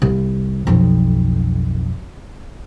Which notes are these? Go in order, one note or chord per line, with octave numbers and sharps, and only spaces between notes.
C2
B1 F2